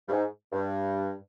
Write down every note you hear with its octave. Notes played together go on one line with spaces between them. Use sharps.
G2
G#2
G2